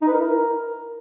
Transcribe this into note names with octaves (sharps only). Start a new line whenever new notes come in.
D#4
B4
A#4
E4
A#4